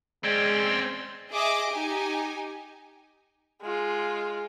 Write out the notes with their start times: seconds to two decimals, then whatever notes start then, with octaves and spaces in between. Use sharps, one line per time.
0.24 G#3 C4 C#4 D5 G5 C6
1.31 G#4 D#5 E5 D6
1.70 D#4 G4 G#5
3.62 G#3 F4